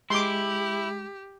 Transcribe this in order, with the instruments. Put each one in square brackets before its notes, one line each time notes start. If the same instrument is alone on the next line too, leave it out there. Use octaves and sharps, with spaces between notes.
[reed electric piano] G#3 [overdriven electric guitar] E4 [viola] G4 [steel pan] C6 D6